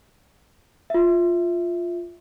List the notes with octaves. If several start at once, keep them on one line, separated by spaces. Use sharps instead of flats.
F4 E5